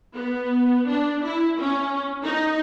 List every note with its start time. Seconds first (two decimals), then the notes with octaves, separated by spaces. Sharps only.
0.16 B3
0.89 D4
1.23 E4
1.60 C#4
2.24 D#4